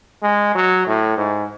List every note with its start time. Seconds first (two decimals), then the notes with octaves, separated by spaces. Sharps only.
0.23 G#3
0.55 F#3
0.86 A2
1.17 G#2